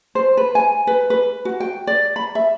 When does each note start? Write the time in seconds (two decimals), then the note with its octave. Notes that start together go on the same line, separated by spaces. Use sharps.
0.15 C5
0.37 B4
0.55 G#5
0.87 B4
1.10 B4
1.45 F#4
1.60 G5
1.87 D5
2.16 B5
2.35 E5